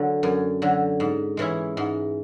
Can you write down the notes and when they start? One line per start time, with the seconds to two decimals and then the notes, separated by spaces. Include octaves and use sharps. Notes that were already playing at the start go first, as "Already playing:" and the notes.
Already playing: D3 F#3
0.23 F#2
0.62 D3 F#3
1.00 G#2
1.37 E3 G#3 C#4 E4
1.77 G#2